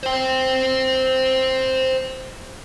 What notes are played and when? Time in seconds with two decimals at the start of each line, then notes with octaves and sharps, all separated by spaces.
0.03 C5 G5